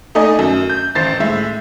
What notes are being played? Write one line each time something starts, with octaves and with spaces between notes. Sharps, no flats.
A3 D#4 D5 D#5 G#5
F#2
G6
A1 C5 A6 C7
A2 G#3 E5